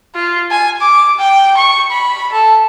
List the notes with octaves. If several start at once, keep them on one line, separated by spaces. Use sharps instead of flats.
F4
G#5
D6
G5
C#6
B5
A4